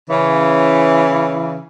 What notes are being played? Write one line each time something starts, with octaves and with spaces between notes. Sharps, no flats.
C#3 E3